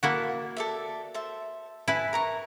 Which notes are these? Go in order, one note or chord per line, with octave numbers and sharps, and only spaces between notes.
A#3 E4 F#4 A5
A4 D5 E5
A4 C5 E5
E4 B4 E5 G#5 A5
A#4 A#5 C#6